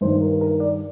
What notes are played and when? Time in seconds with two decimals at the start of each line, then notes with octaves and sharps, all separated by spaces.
0.01 G2 D#3 C5
0.21 A#4
0.41 A#4
0.60 D5